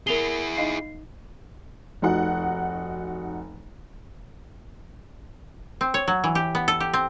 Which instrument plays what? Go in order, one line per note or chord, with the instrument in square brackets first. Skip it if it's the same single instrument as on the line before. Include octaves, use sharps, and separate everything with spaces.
[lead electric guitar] E4 G#4 [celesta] A#4 F7 G7
[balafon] D#4 D#5 F5 [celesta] C7
[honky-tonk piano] F1 D#4 F#4 F#5
[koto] C4
C#5
F#3
E3
G4
B3
A4
G4
C4